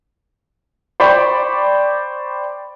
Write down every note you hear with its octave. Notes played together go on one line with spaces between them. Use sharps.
C5 D5 G5 B5 C#6